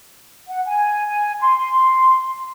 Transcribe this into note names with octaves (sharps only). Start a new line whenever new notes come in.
F#5
G#5
G#5
C6